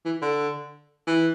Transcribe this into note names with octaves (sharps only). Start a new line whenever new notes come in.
E3
D3
E3